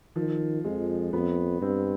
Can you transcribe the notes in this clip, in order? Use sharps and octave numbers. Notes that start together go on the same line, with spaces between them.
D#3 F3
F2 G#3
F2 B3
G2 C4